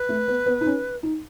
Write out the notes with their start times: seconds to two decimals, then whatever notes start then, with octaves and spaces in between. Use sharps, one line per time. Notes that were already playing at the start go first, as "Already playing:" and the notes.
Already playing: B4
0.09 A3
0.28 B3
0.46 B3
0.61 D#4
0.66 C#4
1.03 D#4